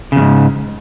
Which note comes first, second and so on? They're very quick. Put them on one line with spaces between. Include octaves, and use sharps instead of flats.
C#3 E2 G#2